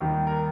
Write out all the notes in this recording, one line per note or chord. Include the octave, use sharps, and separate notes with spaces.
D#2 D#3 G3
A#4